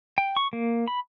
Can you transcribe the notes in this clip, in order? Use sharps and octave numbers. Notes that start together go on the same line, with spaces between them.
G5
C#6
A#3
B5